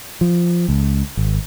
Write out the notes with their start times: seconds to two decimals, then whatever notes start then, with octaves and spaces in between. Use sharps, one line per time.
0.21 F3
0.68 C#2
1.17 G#1